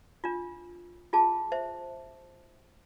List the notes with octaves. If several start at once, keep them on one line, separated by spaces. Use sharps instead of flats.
D4 F4
F4 G#4 A5
C5 E5